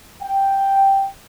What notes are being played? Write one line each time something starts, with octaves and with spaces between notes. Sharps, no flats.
G5